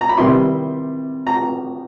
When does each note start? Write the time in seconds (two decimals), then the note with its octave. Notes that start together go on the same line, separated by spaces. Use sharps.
0.01 A#5
0.09 B5
0.18 C3 D#3 G3 B3 E4 C6
1.27 A#5